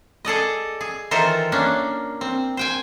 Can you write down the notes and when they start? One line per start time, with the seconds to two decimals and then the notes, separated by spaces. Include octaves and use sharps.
0.25 G#4 A4 D5 D#5
0.81 G#4
1.11 D#3 E3 F4 A4 A#4 C5
1.52 A#3 C#4 D4
2.21 C4
2.57 C5 G5 G#5